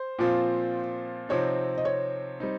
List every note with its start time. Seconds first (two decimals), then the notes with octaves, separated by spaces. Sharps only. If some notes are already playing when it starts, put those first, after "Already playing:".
Already playing: C5
0.19 A#2 F3 C4 F4
1.29 C3 F3 C4 D#4 C#5
1.78 D#5
1.85 C#5
2.40 G3 C4 D#4